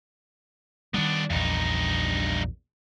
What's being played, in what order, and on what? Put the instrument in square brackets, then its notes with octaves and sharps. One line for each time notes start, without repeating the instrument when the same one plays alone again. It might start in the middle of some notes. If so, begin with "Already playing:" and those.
[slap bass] D#3 G3 [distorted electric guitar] B3 D4
[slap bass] A#1 E2 [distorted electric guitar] G2 D#4